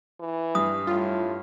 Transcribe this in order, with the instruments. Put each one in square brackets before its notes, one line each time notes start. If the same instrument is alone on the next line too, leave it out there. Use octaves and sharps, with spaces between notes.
[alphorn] E3
[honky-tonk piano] G2 [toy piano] D#6
[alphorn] A2 [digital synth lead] F4